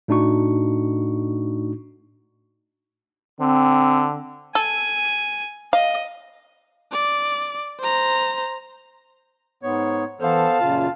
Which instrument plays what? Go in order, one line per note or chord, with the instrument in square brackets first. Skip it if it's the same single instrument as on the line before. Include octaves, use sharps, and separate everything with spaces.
[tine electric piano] A2 A3 D4 D#4 F#4 C#6
[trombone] D3 [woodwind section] C4
[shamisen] A4 [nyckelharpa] G#5
[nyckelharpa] D#5 [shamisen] F5
[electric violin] D5
C5 A#5
[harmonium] G#2 B3 [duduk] C#5
[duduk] E3 [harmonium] B3 A4 C5 [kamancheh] F5 A5
[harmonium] F#2 A#2 C#3 [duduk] F4